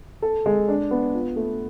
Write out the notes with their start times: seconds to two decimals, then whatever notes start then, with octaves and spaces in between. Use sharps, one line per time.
0.22 A4
0.46 G#3
0.68 D4
0.91 B3
1.14 F4
1.36 A3